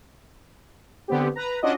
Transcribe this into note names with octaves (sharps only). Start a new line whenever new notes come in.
D3 B3 C4 G4
B4 A#5
C#4 D4 F4 F#4 D5 D#5